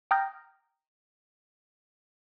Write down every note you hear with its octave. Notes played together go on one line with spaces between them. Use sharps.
G5 A#5 D#6 F6 G6 A#6